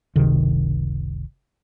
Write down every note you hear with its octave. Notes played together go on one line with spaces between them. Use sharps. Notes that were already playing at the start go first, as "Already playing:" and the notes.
F#1 C#2 C3 D#3